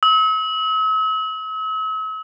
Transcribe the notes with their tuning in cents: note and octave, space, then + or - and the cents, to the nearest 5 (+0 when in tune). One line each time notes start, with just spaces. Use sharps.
E6 -45